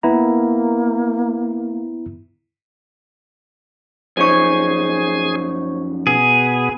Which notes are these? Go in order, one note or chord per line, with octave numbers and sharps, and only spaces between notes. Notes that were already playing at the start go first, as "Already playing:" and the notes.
A#3 B3 E4 A#5
F#2 F3 D#4 G#4 C5 C#5 G#5 C#6
B2 B3 G#4